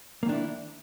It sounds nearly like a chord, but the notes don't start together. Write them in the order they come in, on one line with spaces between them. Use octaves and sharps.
A#3 D#3 D4 E4